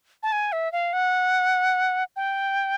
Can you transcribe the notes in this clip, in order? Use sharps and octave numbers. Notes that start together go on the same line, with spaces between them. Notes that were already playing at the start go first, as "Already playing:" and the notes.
A5
G#5
E5
F5
F#5
G5